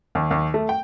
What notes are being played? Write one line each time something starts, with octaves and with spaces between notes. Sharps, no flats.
D#2
D#2
A3
G5